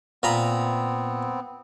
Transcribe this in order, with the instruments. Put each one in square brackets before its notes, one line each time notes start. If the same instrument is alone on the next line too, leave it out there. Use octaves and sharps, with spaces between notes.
[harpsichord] A#2 A#5 B5 [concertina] B3 C4